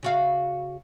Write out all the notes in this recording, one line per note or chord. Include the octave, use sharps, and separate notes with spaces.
C#3 F#4 F5